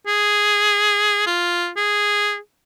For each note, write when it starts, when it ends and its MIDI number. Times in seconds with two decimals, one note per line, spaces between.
0.07 1.26 68
1.27 1.69 65
1.77 2.37 68